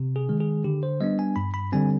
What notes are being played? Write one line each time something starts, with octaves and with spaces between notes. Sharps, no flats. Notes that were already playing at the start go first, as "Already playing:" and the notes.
Already playing: C3
G#4
D#3 G#3
G#4
D3 G4
C5
G3 B3 D4 D#5
G#5
G2 B5
B5
D3 G3 C4 G#5